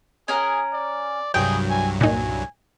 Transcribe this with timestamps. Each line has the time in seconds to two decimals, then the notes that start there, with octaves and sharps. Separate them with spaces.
0.28 C#4 G#4 A#4 F#5
0.73 D5
1.34 C2 G2 F#3 G#4 G5
1.69 G#5
2.01 A#2 D#4 G#5